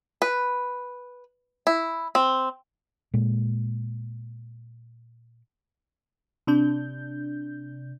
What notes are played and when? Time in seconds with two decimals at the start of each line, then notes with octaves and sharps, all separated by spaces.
0.22 B4
1.67 E4
2.15 C4
3.14 A#2 G#3
6.47 C3 D4 G6